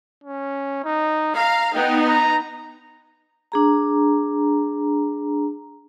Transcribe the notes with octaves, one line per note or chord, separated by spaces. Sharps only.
C#4
D#4
F5 A#5
B3 D#4 G5
A#5
D4 G#4 A#5